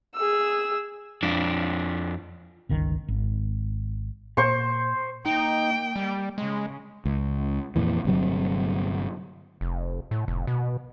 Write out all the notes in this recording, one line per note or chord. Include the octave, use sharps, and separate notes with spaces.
G#4 E6
F2 D4
G1 C#2 D#3
G#1
A#2 C5 C#6
A#3 D#4 G5
G3
C#3 G#3
C#2
F2 A#2 E3
G1 C3 F#3
F1
A2
F1
B2